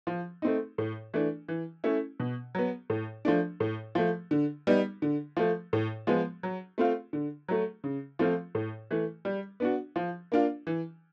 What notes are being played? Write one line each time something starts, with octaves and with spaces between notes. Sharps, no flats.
F3
A3 C4 D#4
A2
E3 A3 D4
E3
A3 C#4 E4
B2
F#3 B3
A2
F3 A3 D4
A2
F3 A3
D3
G3 B3 D#4
D3
F3 A3
A2
F3 G#3 B3
F#3
A3 C4 F4
D3
F#3 A3
C#3
F3 A3 C4 F4
A2
E3 A3
G3
B3 D4 F#4
F3
A#3 D4 F4
E3